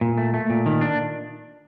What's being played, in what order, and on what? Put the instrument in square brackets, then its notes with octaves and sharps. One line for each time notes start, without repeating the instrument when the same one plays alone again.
[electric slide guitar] A#2
A3
A3
A#2
D#3
D4